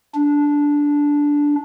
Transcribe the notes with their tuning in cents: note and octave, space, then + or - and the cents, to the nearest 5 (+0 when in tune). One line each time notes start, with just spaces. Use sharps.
D4 -10